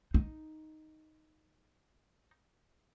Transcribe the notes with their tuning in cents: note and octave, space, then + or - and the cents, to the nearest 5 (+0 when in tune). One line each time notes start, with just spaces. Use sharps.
D#4 +0